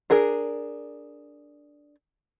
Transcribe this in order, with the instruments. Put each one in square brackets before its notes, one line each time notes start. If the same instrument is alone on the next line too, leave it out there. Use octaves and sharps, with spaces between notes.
[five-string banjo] D4 G#4 A#4